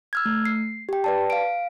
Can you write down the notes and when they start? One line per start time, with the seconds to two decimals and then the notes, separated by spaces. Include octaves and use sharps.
0.13 E6 F6 G#6
0.26 A3
0.45 C7
0.89 G4 G5
1.04 B4 D5 A5
1.30 F5 D7